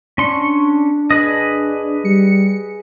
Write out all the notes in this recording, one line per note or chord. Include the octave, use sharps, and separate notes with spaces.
C#4 D4 C6 C#6
G#4 B4 D#5
G3 C#7